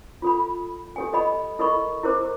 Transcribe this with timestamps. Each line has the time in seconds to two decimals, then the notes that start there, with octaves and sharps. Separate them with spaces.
0.22 F4 A4 B5
0.96 G4 A4 G#5
1.12 G4 A4 D#5 B5
1.59 E4 A4 A#4 D#5 B5 C#6
2.03 E4 G4 A#4 C5 D6